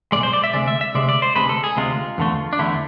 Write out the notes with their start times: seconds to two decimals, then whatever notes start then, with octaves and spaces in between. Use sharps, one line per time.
0.12 B1 B2 G#3 D5
0.23 C5
0.33 D5
0.44 E5
0.53 D2 C3 G#3 D5
0.68 E5
0.81 E5
0.95 D2 C3 G#3 D5
1.09 D5
1.22 C5
1.36 D2 C3 G#3 B4
1.49 A4
1.64 G#4
1.77 D2 C3 G#3 F4
2.18 E2 D3 A3
2.53 D4
2.59 E2 D3 A3 E4